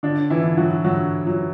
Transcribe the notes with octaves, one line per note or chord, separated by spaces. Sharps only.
D3 D4
E3 E4
D3
F#3 F#4
D3 F#3 F#4
F#3